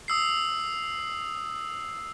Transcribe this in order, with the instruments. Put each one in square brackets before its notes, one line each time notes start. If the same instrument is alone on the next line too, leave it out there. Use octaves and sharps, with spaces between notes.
[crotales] D#6 E6 C7